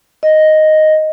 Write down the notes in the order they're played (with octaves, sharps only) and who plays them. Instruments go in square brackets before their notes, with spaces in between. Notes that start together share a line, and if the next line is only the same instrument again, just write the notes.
[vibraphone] D#5